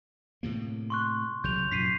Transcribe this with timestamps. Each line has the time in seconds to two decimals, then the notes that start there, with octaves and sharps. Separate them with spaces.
0.43 A2 C3 A#3
0.90 C6 C#6 F#6
1.44 C2 C#3 F#3 G6 F7
1.71 F#2 A#2 B6 C7 D#7